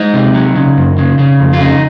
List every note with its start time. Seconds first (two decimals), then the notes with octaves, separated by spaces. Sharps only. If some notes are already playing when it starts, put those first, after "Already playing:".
Already playing: G#3 D#4
0.14 C3
0.35 F#3
0.56 C#3
0.77 F#2
0.98 C#3
1.19 C#3
1.40 F2
1.53 F4
1.61 C#3 D#4